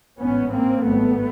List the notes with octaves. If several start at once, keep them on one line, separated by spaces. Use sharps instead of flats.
A1 G#2 B3 C#4
A#3 C4
G#1 G2 A3 B3